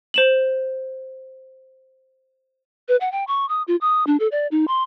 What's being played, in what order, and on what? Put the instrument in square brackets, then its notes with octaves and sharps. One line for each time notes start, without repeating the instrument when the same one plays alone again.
[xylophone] C5 E7 F#7
[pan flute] B4
F#5
G5
C#6
D#6
F4
D#6
D4
A4
D5
D#4
C6